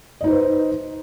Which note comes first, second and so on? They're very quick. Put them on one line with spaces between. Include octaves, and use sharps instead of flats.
D#5 D#4 C5 B4